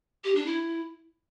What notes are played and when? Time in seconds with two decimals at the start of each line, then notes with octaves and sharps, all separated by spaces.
0.24 G4
0.35 D4
0.46 E4